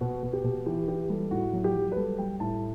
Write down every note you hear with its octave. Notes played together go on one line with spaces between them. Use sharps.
B2 F#4
B2
G4
B2
E3 G4
E3 G4
G3 A4
A2 F#4
F#3
G4
F#3
B4
G3 A4
G3 G5
A2 A5